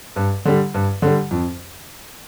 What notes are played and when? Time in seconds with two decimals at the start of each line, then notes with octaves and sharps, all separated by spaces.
0.16 G2
0.45 D3 G3
0.74 G2
1.02 D3 G3
1.31 F2